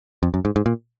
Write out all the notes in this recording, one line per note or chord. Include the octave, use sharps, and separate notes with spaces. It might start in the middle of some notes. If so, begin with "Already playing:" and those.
F2
F#2
G#2
G#2
A#2